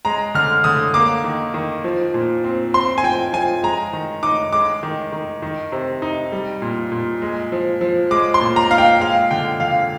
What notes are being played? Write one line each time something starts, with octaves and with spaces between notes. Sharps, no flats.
G#3 A#5
D3 F6
D3 D#6
A#3 D6
D#3
D#3
F3
A#2
C4
C4 C6
G#5
F3 G5
F3 G#5
G#3 A#5
D#3
D#4 D6
G#3 D6
D#3
D#3
D#3
C3
D#4
G3
A#2
A#2
G#3
F3
F3
G#3 D6
C6
A#2
A#5
D#4 F5
G5
G#3 F5
D3 G5
D3 F5